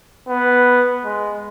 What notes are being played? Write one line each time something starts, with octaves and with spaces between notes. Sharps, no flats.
B3
G#3